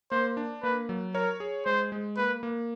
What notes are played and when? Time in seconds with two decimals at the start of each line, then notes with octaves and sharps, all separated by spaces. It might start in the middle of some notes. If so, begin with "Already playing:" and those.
0.12 A#3 C5
0.37 D4
0.63 A#3 B4
0.89 F#3
1.14 A#4 C#5
1.40 G#4
1.66 G#3 C5
1.92 G#3
2.17 A#3 B4
2.43 A#3